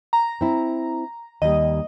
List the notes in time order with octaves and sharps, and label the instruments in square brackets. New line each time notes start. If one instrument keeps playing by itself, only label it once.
[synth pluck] A#5
[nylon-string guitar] C4 E4
[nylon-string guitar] D#2 G3 [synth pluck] D#5